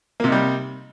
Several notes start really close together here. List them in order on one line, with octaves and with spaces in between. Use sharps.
A#3 C3 D#4 G3